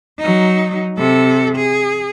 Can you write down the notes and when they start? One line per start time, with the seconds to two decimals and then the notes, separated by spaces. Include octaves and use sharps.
0.19 F#3 D#4
0.97 C3 A4
1.56 G#4